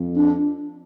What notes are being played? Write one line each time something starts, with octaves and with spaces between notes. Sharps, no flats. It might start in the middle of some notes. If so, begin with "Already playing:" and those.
Already playing: F2
D4